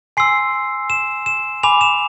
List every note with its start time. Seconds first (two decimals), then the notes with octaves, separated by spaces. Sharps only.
0.17 G#5 C6 E6 C7
0.90 E7
1.26 E7
1.63 G#5 B5 D6 F7
1.81 E7